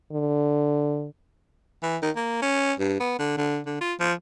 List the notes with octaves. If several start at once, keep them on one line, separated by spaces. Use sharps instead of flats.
D3
E3
D#3
A#3
C#4
G2
B3
D3
D3
D3
F4
F3